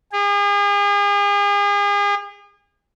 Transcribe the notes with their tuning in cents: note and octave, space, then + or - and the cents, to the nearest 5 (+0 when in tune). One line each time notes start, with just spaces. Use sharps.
G#4 -40